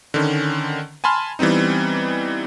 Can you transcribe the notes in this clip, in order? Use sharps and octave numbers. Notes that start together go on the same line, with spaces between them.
D3 D#3 C#4
G#5 A5 B5 C6 F6
E3 G3 B3 C4 D#4